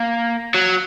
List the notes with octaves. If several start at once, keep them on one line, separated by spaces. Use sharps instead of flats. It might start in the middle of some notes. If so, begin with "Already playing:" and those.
Already playing: A#3
F#3